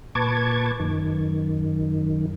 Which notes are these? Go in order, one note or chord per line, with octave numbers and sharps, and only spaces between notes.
A#2 B4 A5 C#6 D6 G#6
F#2 D#3